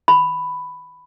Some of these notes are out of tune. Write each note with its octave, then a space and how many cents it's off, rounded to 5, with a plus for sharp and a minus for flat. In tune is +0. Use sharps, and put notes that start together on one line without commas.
B5 +10